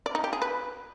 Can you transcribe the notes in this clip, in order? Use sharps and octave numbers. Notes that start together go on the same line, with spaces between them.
D5
D#4
G4
G#4
B4